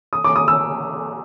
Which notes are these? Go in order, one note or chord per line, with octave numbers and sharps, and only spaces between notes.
D#6
D6
D#6
E6